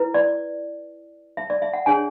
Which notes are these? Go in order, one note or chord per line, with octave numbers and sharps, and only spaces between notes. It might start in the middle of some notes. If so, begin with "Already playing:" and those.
Already playing: E4 B4
D5
E5
D5
E5
F#5
D4 G#4 C#5 G#5